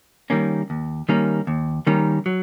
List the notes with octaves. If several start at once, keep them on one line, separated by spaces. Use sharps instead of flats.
D#3 G3 A#3 C#4
D#2
D#3 G3 A#3 C#4
D#2
D#3 G3 A#3 C#4
F#3